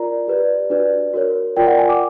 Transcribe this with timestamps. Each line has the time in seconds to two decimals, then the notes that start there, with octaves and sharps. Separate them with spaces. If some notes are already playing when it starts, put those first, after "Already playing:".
Already playing: F4 A#4 D5 A#5
0.28 G4 B4 D5
0.70 D4 F#4 B4 D5
1.13 F#4 A#4 C#5
1.57 F4 A#4 D5 G5
1.67 F#5
1.78 G#5
1.89 D6